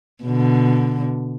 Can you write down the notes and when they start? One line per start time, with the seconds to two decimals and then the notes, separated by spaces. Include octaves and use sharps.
0.24 B2 D3